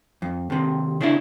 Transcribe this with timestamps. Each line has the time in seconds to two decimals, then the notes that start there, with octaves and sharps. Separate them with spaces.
0.22 F2
0.50 D#2 C3
1.01 C#3 D4 E4